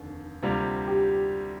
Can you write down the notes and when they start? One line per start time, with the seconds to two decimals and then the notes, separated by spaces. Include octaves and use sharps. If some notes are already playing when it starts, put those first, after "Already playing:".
Already playing: F1 D#2 D3
0.43 D2 C3 G3 A#3 F4
0.87 G4